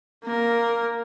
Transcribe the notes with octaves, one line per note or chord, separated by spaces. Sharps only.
A#3 A#4